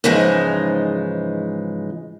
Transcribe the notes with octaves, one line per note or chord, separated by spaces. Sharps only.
G#2 C#3 E3 F3 G#3 D#4